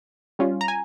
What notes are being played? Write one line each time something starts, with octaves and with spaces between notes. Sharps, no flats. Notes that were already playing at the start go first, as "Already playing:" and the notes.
G3 C#4 F4
A#5
G#5